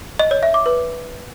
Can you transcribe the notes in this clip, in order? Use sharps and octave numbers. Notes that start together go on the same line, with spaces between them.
D#5
C#5
E5
D6
B4